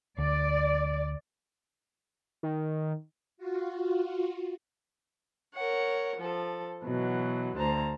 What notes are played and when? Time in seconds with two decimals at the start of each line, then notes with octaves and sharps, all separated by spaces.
0.18 D2 D5
2.43 D#3
3.37 F4 F#4
5.55 A#4 C#5 F#5
6.17 F3 A4
6.84 B2 E3 F#3
7.57 D2 C5 A5 A#5